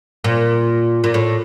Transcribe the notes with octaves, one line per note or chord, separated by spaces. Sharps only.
A#2
A#2
A2